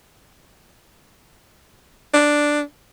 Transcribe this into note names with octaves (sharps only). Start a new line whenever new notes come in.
D4